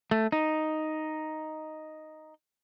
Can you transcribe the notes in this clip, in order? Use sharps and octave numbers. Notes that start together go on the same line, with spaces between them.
A3
D#4